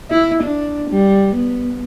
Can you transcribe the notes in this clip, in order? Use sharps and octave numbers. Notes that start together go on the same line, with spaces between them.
E4
D4
G3
B3